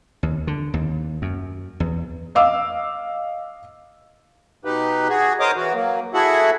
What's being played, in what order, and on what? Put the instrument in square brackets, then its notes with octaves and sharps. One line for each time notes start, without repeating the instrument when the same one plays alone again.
[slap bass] D#2
D3
D#2
F#2
E2
[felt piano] D#5 F5 D6 E6
[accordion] B2 D#4 G4 B4
F#4 G#4
A#4 C5 C#5 D#5 D6 D#6
E3 F#4
F#3 A#3
E4 F#4 G#4 A4 E5 F#5